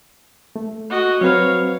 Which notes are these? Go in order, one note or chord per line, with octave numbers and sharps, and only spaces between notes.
A3
F#4 D#5
F#3 C4 B4 C#5 F5